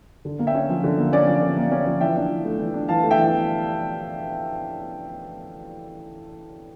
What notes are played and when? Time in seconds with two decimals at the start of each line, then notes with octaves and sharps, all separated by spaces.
0.25 D3
0.39 A#3
0.47 E5 G5
0.55 C#4
0.69 F3
0.84 D3
0.98 A#3
1.13 C#4 D5
1.27 F3
1.35 D5
1.42 D3
1.57 A#3
1.72 C#4
1.86 F3
2.01 E3 E5 G5
2.16 D4
2.31 E3
2.45 A3
2.59 E3
2.74 D4
2.88 E3 F5 A5
3.03 A3
3.11 E5 G5
3.18 E3